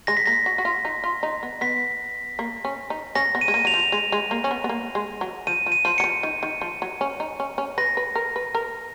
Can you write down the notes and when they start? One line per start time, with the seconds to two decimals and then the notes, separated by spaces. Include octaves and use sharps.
0.07 G#3 A#6
0.17 B6
0.26 A#3 A#6
0.46 F#4
0.58 F#4
0.65 F4
0.85 D#4
1.04 F4
1.23 D#4
1.43 B3
1.61 B3 B6
2.39 A#3
2.65 C#4
2.90 D#4
3.15 C#4 A#6
3.35 B3
3.41 D#7
3.48 G#3
3.54 A#3
3.65 F#3 F7
3.74 F3
3.92 G#3
4.12 G#3
4.31 A#3
4.44 C#4
4.51 B3
4.64 B3
4.69 A#3
4.95 G#3
5.21 F#3
5.47 F3 D#7
5.66 F3
5.72 D#7
5.85 F3
5.98 F#3 C#7
6.04 F3
6.23 D#3
6.43 D#3
6.61 F3
6.82 F#3
7.01 C#4
7.20 D#4
7.40 C#4
7.58 C#4
7.78 B4 A#6
7.97 B4
8.15 A#4
8.36 B4
8.55 A#4